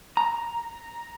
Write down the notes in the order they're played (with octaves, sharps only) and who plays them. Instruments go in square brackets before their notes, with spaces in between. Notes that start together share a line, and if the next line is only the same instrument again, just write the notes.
[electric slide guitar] A#5